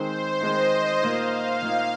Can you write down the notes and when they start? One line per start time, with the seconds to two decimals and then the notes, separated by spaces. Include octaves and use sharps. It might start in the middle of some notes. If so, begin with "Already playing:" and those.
Already playing: D#3 G#3 C4 D#4 C5
0.41 D#3 G#3 C4 D#4 D#5
0.71 D#5
1.02 A#2 A#3 D#4 F5
1.62 A#2 A#3 D#4